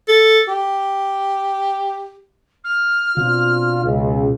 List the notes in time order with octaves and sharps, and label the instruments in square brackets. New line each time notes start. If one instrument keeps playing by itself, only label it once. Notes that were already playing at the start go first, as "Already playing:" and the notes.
[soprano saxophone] A4
G4
[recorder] F6
[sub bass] B2 [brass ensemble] C4 D4 F4
[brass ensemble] C#2